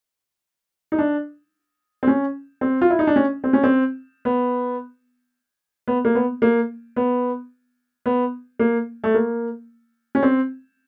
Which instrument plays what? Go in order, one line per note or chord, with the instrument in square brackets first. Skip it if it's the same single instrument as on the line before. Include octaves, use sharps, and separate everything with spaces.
[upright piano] D#4
D4
C4
C#4
C4
F4
E4
D#4
D4
C#4
C4
C#4
C4
B3
B3
A#3
B3
A#3
B3
B3
A#3
A3
A#3
C#4
C4